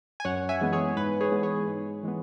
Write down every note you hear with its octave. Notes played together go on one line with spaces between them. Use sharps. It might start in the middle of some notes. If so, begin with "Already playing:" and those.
G#5
F#2 C#5 F#5
E5 G#5
E3 G#3 B3
G#4 C#5
G#2 B4
G#4 C#5
E3 G#3 B3
G#4 C#5
G#2
E3 G#3 B3